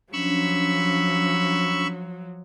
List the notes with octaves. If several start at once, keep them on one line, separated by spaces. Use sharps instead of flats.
F3 F#3 C#4 D4 B5 C#6 E6